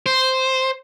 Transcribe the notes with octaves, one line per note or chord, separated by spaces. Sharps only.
C5